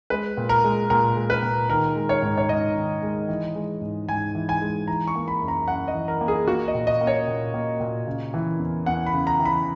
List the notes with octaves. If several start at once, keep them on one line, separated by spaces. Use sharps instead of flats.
G#3 B4
A#2
A#4
G#3
A#2 A#4
G#3
B4
A#2
D#3 A#4
G#3
C#5
G#2
C#5
G#2 D#5
D#3
G#3
E3
G#3
G#2
G#2 G#5
E3
G#5
G#3
E3 A#5
C#6
A#3
B5
F#2
A#5
F#2 F#5
D#5
E3
A#4
A#3
G#4
A#3 F#4
D#5
A#2
D#5
A#3
C#5
A#2
A#3
A#2
C#3
E3
E2
E2 F#5
B5
C#3
A#5
E3
B5